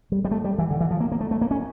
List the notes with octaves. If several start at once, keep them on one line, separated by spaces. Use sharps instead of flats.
G3
G3
A3
G3
E3
D3
E3
F3
A#3
A#3
A3
A3
A#3
C#4